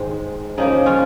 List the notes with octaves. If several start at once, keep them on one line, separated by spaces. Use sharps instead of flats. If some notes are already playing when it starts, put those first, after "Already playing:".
Already playing: G#2 D#3 G#3
C#3 F3 A#3 D#4
C#4 F4